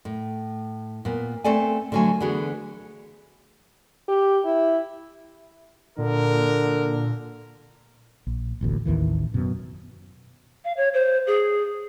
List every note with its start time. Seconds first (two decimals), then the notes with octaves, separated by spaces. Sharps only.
0.05 A2
1.05 A#2 B3
1.44 A3 B3 C4 A4 D5 G#5
1.92 D3 F3 F#3 A3 G#5
2.20 D3 E3 B3 F#4 G#4
4.08 G4
4.45 E4
5.98 A#2 D3 A#4
8.27 A#1
8.61 E1 A1 D2
8.85 A1 D#2 D#3 E3
9.34 F#2 B2
10.65 F5
10.77 C#5
10.94 C5
11.27 G#4